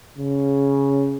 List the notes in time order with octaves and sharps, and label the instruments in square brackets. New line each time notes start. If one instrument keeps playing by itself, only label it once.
[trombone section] C#3